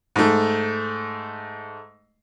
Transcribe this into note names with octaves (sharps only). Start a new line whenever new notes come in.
G#2 A3